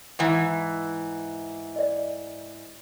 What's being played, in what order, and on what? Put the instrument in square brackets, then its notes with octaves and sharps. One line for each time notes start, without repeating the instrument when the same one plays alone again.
[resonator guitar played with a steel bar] G#2 E3
[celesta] D5 D#5